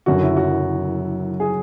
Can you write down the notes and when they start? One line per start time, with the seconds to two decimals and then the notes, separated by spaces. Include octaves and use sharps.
0.06 F#1 F#2 D3 F#4
0.22 E4
0.37 F#4
1.40 G#4